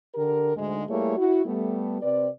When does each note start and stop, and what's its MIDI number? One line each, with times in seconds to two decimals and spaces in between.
0.15 0.52 50
0.15 0.52 67
0.15 0.52 70
0.56 0.83 38
0.56 0.83 44
0.56 0.83 56
0.89 1.14 55
0.89 1.14 57
0.89 1.14 58
0.89 1.14 64
0.89 1.14 68
0.89 1.14 73
1.17 1.44 64
1.17 1.44 66
1.46 2.01 55
1.46 2.01 57
1.46 2.01 59
2.02 2.28 48
2.02 2.28 60
2.02 2.28 71
2.02 2.28 74